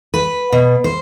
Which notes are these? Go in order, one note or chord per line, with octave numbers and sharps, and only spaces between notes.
B4
B2
C5